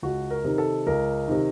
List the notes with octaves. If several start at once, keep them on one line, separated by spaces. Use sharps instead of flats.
C#2 F#4
A#4
C3 D#3
A4
C#2 A#4
C3 D#3